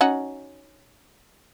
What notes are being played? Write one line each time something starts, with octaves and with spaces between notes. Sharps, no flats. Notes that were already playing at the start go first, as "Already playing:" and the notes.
C#4 D#4 F#4